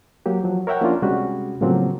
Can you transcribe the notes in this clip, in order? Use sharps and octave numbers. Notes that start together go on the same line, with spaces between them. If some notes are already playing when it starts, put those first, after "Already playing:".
F#3 A#3 G4
F3 F#3
A#4 C#5 E5 F#5 G5
F3 A#3 C#4 D4 F4
C3 G3 G#3 C#4 F#4 G4
A2 C#3 F3 F#3 A#3 C4